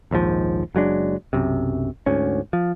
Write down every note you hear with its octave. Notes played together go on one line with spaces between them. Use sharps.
A#1 D#2 G#2 F3
F#1 F#3 G#3 D4
B1 F#2 C3
D2 G#2 C#4
F3